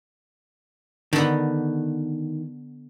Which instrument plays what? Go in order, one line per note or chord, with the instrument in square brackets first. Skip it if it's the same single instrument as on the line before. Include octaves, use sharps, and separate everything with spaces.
[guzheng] D3 B3 [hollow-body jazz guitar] D#3